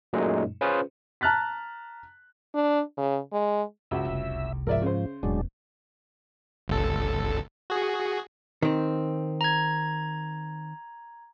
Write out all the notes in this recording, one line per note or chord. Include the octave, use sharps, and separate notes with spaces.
F#2 A#2 F#3 G#3 A3 D#4
C#4 F4 G#4 B4 C5
A5 A#5 F6 F#6 A6 B6
D4
C#3
G#3
C#2 F#4 E5
F1 C2
G#2 F3 A#4 D5 E5
C#3 C5
E1 A2 F#3 G#3 D4
G1 C#2 A4
F#4 G#4
D#3 C4
A#5 G#6